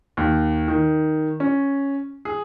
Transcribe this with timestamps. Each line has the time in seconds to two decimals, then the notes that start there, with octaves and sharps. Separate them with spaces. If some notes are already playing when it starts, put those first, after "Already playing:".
0.17 D#2
0.68 D#3
1.40 C#4
2.25 G#4